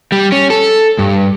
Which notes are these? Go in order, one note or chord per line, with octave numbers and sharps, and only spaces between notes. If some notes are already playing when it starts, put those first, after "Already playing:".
G3
C#4
A4
G2